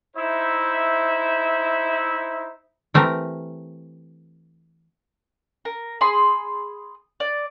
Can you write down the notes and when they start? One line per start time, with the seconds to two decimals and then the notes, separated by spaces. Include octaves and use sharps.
0.16 D#4 E4 C5 E5
2.94 E3 A3 C4 G4 A#4
5.65 A#4
6.01 G#4 B5 C6
7.20 D5